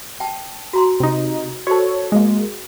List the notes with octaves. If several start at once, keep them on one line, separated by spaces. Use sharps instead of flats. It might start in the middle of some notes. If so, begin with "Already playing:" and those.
G5 A5
F#4 A#5 C6
C3 D#4
F#4 A4 C5 C#5
G#3 A#3